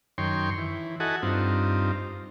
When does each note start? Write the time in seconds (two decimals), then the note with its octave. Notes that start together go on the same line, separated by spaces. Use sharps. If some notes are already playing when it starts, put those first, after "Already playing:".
0.18 F#2 D#3 C#5 G5 C6
0.58 E3
1.00 E4 F#4 A4 D#5 F#5 G#5
1.22 G2 C4 D#4 F4